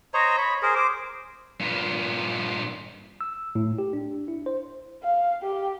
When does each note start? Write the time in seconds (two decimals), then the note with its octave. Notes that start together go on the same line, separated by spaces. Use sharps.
0.14 C5 C#5 D#5 A#5
0.38 C#5 B5
0.62 G#4 A#4 C5
0.76 C5 D6
1.60 G2 A#2
3.21 E6
3.55 A2
3.78 G4
3.93 D4
4.28 E4
4.46 C5
5.03 F5
5.42 G4